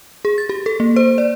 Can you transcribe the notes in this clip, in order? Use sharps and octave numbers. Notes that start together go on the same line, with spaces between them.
G#4
A6
G4
A4
A#3
C5
D5